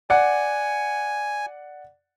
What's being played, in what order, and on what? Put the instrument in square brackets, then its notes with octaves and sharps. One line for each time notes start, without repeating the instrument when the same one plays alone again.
[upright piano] D5 F#5 [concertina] G#5